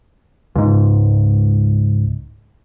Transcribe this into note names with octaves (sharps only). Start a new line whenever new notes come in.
C#2 G#2